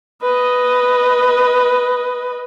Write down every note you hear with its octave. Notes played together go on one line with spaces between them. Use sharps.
B4 D#5